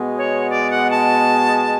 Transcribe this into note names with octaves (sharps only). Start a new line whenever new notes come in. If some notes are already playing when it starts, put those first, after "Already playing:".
Already playing: B2 G#3 B3
C#5
D5
F#5
A5